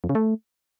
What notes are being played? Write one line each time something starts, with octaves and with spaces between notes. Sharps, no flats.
F2
C#3
A3